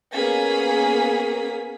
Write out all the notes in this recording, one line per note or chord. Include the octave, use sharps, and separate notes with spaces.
A#3 B3 C#4 G#4 B6